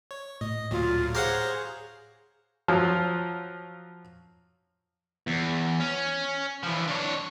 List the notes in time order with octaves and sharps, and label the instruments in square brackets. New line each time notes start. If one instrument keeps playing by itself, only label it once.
[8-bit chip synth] C#5
[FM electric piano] A2 [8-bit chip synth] D#5
[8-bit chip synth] D2 A#2 F#3 [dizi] F4
[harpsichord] G4 F5 F#5 [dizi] G#4 [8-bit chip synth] C5 C#5 A#5
[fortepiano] F3 F#3
[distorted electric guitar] E2
C#4
E3 F3
D4 C#5